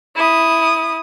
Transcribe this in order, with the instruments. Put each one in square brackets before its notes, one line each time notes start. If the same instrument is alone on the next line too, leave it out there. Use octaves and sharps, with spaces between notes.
[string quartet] E4 D#6